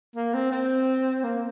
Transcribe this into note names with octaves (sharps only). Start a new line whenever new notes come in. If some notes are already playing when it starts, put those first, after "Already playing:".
A#3
C4
C4
A#3